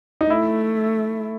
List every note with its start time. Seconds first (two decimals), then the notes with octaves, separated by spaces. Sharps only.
0.21 D#4
0.30 A3 E4